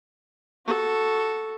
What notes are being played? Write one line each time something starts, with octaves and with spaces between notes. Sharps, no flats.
F#4 A4